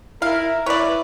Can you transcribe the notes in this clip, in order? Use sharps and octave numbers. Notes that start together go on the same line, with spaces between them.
E4 A#4 F5
E4 B4 C#5 D5